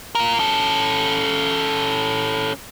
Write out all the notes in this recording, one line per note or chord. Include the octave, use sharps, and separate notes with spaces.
F4 A#4
C#4 A4